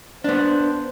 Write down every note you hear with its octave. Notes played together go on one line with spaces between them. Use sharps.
B3 D4 C5